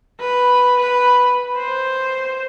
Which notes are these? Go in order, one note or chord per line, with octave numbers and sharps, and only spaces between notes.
B4
B4
C5